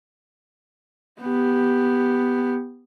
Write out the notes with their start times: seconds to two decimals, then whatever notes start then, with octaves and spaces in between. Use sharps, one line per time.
1.21 B3 G4